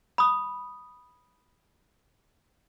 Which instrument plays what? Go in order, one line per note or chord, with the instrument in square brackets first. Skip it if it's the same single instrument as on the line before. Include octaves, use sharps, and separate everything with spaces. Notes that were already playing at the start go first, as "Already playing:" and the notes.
[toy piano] B5 D#6